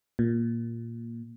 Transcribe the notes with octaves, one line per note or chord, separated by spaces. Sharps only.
A#2